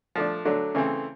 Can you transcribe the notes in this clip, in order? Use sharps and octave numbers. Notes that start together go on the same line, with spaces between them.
F3 A3 D4
D3 F#3 A3 D4
C#3 E3 A3 C4